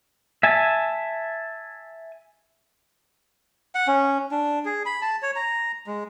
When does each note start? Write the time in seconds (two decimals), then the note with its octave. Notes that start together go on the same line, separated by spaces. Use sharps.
0.43 E5 G#5 A5
3.75 F#5
3.88 C#4
4.31 D4
4.65 G#4
4.86 B5
5.02 A5
5.22 C#5
5.36 A#5
5.87 G#3